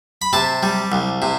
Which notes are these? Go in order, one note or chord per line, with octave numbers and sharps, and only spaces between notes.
B5
C3 A5
G3
C2
C3